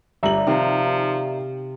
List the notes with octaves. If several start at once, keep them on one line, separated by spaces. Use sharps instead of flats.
G1 G3 D5 E5 A#5 F#7
C3 D#3 F3 F5